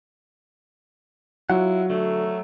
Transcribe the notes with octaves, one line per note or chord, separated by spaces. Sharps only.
F#3 E4 F4 F#5
D3 A3